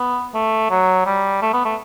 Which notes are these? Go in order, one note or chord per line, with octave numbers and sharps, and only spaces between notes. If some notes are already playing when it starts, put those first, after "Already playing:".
Already playing: B3
A3
F#3
G3
A3
B3
A3